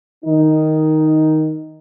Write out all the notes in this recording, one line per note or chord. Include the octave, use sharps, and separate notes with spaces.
D#3 D#4